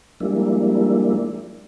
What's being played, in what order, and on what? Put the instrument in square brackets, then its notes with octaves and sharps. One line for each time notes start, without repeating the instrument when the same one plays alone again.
[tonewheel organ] F3 G3 G#3 A#3 D4 E4